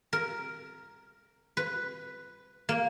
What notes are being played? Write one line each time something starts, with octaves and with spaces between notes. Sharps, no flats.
A#4
B4
A#3